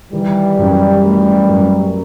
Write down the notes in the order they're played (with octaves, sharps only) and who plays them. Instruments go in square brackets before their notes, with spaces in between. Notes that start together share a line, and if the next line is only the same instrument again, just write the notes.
[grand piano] D#3 [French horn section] E3 G3
[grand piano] F#2
A3
F#2